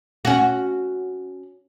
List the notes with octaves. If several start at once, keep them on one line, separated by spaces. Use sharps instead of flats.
C#4 F#4